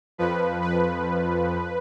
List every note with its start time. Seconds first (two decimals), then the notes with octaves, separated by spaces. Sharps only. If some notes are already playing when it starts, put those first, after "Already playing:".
0.18 F2 F3 B4
0.62 B4